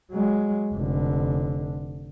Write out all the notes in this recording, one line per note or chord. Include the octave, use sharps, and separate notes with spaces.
F#3 G#3
F1 D3